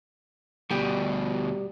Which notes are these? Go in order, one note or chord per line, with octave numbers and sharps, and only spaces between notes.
D2 B2 G3 G4